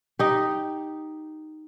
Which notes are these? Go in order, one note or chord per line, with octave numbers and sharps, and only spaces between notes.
D#4 G4